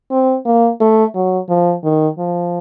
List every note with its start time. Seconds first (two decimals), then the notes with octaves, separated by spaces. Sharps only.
0.11 C4
0.45 A#3
0.80 A3
1.15 F#3
1.49 F3
1.84 D#3
2.18 F3